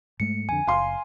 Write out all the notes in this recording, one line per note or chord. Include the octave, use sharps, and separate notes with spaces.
G#2 G#3 A3 C#7
F2 D3 G#5
F#1 F5 C6